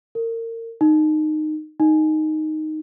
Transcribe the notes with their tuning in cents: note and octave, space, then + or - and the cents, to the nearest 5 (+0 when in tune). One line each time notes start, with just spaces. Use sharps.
A#4 -30
D#4 -15
D#4 -5